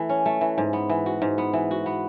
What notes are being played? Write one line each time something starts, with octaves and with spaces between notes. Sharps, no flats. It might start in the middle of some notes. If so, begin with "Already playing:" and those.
Already playing: E3 A3
C#4
A3
E3
G#2
B3
E3
F#4
G#2
B3
E3
F#4
B3